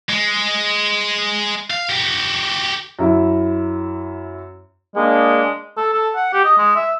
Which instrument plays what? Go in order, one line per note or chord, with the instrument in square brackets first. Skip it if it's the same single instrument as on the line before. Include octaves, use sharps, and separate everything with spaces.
[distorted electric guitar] G#3
F5
F#4 G4
[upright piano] F#2 E4
[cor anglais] G#3 [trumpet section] A#3 D4 G#4
[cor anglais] A4
A4
F#5
G4
D#5
G#3
E5